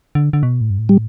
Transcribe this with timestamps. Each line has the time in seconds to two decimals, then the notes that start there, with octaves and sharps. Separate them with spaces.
0.15 D3
0.33 D3
0.43 B2
0.61 A2
0.70 G2
0.79 A2
0.89 G3